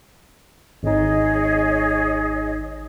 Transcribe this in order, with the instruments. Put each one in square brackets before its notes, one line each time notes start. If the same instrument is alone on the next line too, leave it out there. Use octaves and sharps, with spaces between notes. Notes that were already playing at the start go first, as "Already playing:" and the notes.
[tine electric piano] G#1 D#4 [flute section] G#4 C#5 D#5